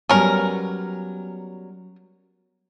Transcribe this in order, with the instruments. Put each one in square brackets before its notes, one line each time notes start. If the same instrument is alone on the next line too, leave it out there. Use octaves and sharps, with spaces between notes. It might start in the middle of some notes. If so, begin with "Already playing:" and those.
[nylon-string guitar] F#3 G3 B3 [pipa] C#4 A#4